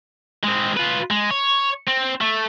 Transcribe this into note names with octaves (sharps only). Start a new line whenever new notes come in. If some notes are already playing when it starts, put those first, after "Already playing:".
G#3 C4
F4 B4
G#3
C#5
C4
A3